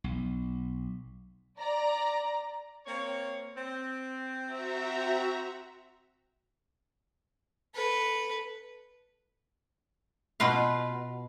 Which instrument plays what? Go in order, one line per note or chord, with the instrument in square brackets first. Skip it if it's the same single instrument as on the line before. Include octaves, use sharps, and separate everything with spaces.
[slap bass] B1
[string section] D5 A#5
[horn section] A#3 C4 C#5
C4
[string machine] F#4 E5 A#5
[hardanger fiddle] A4 B4
[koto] B2 F4 B4 F5